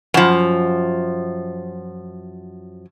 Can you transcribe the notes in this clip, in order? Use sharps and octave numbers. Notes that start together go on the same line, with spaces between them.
F#2 F3